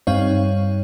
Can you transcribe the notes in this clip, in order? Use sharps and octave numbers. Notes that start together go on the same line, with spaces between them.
G2 G3 C4 D#4 C#5 F5